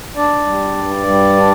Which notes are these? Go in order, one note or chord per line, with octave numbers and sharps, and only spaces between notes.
D4 D5
G3
G2
G3
D4